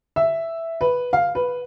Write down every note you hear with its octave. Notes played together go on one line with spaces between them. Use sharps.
E5
B4
F5
B4